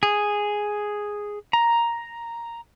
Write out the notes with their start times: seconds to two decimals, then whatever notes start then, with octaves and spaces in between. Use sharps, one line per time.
0.03 G#4
1.53 A#5